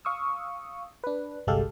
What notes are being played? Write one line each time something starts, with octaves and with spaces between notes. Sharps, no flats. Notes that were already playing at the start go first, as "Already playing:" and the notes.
F5 C#6 D#6 E6
D4 B4
G1 C2 G#3 G4 A4 F5